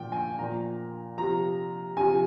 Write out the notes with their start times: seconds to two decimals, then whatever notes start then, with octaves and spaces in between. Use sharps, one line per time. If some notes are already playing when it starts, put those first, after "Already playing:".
Already playing: A#2 F3 G5
0.12 G#5
0.39 A#2 F3 A#5
1.17 C3 F3 A#5
1.97 C3 F3 G#5